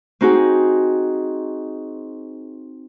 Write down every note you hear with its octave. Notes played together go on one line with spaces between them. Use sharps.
C4 D#4 F#4 G#4